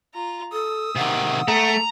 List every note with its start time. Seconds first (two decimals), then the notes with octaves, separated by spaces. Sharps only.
0.14 F4 A#5
0.53 A4 D#6 E6
0.96 C3 D#3 F#5
1.48 A3 A#5